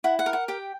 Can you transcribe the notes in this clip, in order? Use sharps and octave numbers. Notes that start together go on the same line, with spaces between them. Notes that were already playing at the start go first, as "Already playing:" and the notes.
E4 F#5
F#5
A#4
F#5
G4 G5